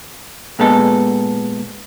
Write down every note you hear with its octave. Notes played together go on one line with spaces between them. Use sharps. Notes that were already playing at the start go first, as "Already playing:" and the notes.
A#2 G#3 B3 A4